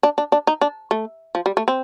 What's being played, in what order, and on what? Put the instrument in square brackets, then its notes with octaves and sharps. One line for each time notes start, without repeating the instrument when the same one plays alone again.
[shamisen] D4
D4
D4
D#4
D4
A3
F3
G3
A3
C4